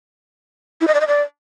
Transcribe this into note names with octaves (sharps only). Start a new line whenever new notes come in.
E4
D#5
D5
D#5
D5